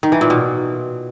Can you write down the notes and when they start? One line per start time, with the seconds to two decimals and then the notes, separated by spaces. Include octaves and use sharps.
0.03 D#3
0.12 E3
0.21 A#2
0.30 B2